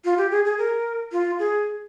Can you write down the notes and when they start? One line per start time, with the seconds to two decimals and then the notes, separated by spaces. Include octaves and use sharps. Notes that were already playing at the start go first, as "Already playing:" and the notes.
0.05 F4
0.18 G4
0.31 G#4
0.45 G#4
0.58 A#4
1.12 F4
1.39 G#4